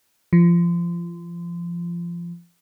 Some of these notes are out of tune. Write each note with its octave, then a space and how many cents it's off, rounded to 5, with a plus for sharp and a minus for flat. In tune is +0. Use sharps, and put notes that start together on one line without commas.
F3 -25